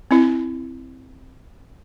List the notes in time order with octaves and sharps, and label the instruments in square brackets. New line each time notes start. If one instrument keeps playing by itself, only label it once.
[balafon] C4 E4